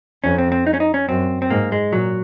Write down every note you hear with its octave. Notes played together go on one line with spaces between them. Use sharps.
F2 C#4
C4
C4
D#4
C#4
D#4
C#4
F#2 C4
C4
G#2 A#3
G#3
A#2 F#3